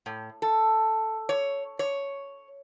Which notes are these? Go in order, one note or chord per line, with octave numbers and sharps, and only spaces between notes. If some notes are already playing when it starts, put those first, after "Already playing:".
A2
A4
C#5
C#5